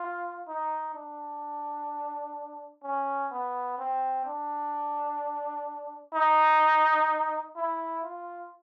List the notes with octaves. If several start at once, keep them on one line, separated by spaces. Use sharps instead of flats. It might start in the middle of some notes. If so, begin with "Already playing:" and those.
Already playing: F4
D#4
D4
C#4
B3
C4
D4
D#4
E4
F4